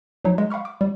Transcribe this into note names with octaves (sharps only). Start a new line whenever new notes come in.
F3 F#3 D#4
G#3
F5 F#5 B5 C#6 F6
D6
G3